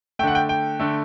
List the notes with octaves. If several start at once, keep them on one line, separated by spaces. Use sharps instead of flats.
D3 A3 F#5 G5
G5
G5
D3 A3